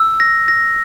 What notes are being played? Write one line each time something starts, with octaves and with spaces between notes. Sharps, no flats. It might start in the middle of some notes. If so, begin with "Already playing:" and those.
Already playing: E6
A#6
A#6